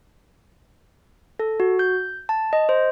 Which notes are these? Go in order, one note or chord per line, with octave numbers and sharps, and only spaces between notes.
A4
F#4
G6
A5
D#5
C5